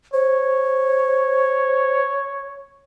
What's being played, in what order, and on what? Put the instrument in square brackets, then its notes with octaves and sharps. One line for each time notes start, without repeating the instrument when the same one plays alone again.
[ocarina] C5 [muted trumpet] C#5